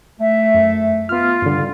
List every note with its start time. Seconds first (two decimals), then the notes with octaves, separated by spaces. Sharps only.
0.20 A3 E5
0.54 F#2
1.09 B3 F4 F6
1.42 G2 D3 G3